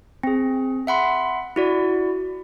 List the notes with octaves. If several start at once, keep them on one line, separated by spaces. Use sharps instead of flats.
C4 G#4
E5 F#5 B5 C6
E4 F#4 D5